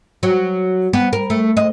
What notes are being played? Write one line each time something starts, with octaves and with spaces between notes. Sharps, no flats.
F#3
B3
A#4
A3
D#5